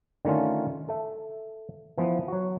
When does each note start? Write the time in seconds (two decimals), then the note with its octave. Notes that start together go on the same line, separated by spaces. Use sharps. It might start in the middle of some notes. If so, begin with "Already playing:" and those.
0.25 D3 D#3 A3 C#4 F4
0.89 A4 E5
1.98 E3 F3 B3
2.28 F#3 F#4